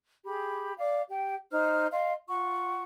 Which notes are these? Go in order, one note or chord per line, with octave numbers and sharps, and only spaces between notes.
G4 G#4 B5
D5 F5 D6
G4 G5
D#4 C5 F6
D#5 F5 C6
F4 F#5 C#6